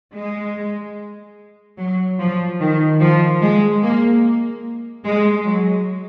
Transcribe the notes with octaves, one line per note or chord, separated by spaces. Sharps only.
G#3
F#3
F3
D#3
F3
G#3
A#3
G#3
F#3